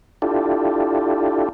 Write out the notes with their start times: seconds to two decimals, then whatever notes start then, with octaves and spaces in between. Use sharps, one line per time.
0.22 D4 E4 F4 G4 A4